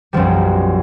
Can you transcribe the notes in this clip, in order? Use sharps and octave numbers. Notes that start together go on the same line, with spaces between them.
B1 F#2 F3 G3